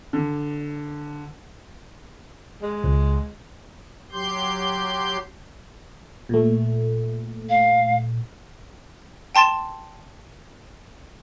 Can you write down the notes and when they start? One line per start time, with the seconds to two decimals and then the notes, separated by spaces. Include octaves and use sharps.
0.13 D3
2.62 G#3
2.84 C#2
4.12 F#3 G4 C6 G6
6.29 A#2 A3
7.49 F5
9.35 G5 A5 C6 A6 E7